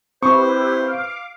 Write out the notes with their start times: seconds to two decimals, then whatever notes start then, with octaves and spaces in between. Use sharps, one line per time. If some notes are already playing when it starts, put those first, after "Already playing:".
0.23 C4 E4 G4 B4 C5 C#6
0.81 F5 D6